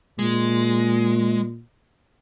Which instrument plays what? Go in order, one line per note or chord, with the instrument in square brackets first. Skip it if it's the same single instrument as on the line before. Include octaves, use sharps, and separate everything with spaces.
[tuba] A#2 [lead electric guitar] G#3